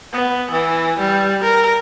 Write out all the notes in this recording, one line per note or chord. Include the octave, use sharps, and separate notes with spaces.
B3
E3
G3
A#4